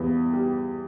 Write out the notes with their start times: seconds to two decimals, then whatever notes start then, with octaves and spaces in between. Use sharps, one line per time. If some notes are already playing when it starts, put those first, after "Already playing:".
Already playing: E2 G3
0.33 G3